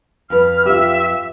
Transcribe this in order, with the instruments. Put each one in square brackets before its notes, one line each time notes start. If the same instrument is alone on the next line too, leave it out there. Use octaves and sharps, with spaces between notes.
[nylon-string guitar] F2 B4 [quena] F6
[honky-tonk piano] F4 G4 [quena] E5